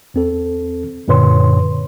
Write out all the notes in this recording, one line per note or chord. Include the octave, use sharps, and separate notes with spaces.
E2 C4 A4
F#2 A#2 D3 B4 C#5 C6